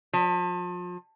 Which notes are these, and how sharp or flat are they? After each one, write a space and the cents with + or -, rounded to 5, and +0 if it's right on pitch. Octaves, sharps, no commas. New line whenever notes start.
F3 +35